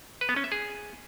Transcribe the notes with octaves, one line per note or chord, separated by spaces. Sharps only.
B4
B3
C#4
E5
G#4